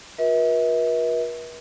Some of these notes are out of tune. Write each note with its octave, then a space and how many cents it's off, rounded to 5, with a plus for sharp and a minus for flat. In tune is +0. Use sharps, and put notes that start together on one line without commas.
F#4 -45 B4 -45 E5 -40